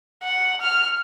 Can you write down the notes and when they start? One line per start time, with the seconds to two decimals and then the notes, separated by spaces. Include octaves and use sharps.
0.23 F#5
0.61 F6